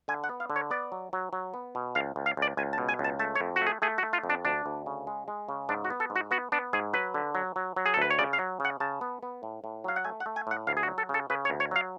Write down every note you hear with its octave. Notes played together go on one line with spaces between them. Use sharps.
D3 G#5
F#5
B3
F5
D3
C#5
B3 D5
F#3
F#3
F#3
B3
B2
C#2 F5
C#2
F5
C#2 D5
C#2 G#5
A5
B2
G#5
C#2
A5
A3 A5
C#5
F2
F#4
A3
G#4
A3 G#4
F#4
A3
F4
F2
D4
D2 D4
D2
C#3
G#3
G#3
C#3
G#2 D4
F#4
B3
A4
G#2
F#4
B3 F#4
B3 D4
G#2 G#4
F#3 B4
D3
F#3
F#3
F#3
G#4
A4
D2 B4
C#5
C#3 D5
F5
F#3
C#3 F#5
C#3 A5
B3
B3
A2
A2
F#3 F5
F#5
A3 G#5
F#5
A3
G#5
A2 F#5
D2 F5
G#4
F#4
F#3
A4
C#3 A4
C#3 B4
C#5
D2
C#5
F#3 F5